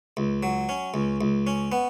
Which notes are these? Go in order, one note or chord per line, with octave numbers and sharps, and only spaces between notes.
C#2
F#3
C#4
C#2
C#2
C#4
B3